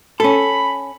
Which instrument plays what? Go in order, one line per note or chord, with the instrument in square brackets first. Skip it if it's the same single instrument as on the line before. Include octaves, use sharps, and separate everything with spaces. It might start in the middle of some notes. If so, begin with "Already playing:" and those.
[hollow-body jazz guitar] C#4 A4 [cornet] B5